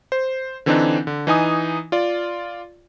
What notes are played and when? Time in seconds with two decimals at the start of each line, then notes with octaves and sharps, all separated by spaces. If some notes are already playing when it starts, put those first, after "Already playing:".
0.12 C5
0.66 D3 E3 C4 D4 D#4
1.07 D3
1.27 E3 D#4 G#5 D#6
1.92 F4 D5